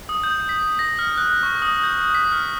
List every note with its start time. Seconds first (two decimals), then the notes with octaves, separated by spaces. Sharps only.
0.09 D#6
0.24 G6
0.49 B6
0.79 A#6
0.99 F6
1.17 F#6
1.43 C#6
1.62 D#6
1.84 G6
2.15 B6
2.32 F6